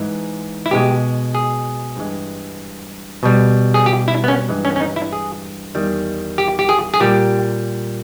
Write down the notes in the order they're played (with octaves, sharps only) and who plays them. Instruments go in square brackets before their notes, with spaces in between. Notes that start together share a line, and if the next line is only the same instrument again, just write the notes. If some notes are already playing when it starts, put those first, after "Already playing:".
Already playing: [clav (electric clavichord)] G#2 E3 G#3
E4
B2 G#3 G4
G#4
G2 E3 G#3
B2 G3
G#4
G4
E4
B3
C#4
G2 E3 G#3
C#4
C#4
D#4
E4
G#4
E2 D#3 G3
G4
G4
G#4
G#4
A#2 G3 G4